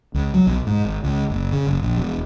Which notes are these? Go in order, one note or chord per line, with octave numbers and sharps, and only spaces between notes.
C#2
F#3
B1
G#2
G#1
C#2
F#1
C#3
F#1
A#1
E1